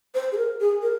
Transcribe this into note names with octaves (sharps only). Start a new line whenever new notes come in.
C5
G#4
A#4
G#4
A#4